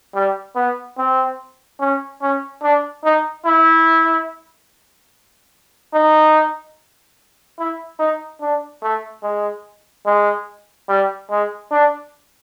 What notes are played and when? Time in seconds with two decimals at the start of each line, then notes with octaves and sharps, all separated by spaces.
0.14 G3
0.55 B3
0.98 C4
1.80 C#4
2.22 C#4
2.63 D4
3.04 D#4
3.45 E4
5.94 D#4
7.59 E4
8.00 D#4
8.41 D4
8.82 A3
9.23 G#3
10.06 G#3
10.89 G3
11.30 G#3
11.71 D4